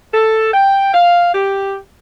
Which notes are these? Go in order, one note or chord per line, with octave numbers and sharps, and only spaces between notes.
A4
G5
F5
G4